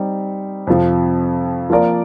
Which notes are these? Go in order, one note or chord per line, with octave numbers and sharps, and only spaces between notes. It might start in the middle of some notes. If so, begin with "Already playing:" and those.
Already playing: G3 C4 D#4
F2 C3 F3
F3 A#3 F4 A#4 D5